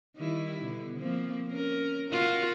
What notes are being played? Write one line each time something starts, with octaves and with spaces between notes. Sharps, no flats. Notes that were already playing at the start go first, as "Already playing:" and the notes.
D#3 G3 E4
B2 D3
F3 A#3 C4
C#4 A#4
F4 F#4 A#4